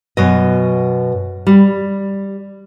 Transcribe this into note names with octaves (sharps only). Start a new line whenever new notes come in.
F#2 B2 D#5
G3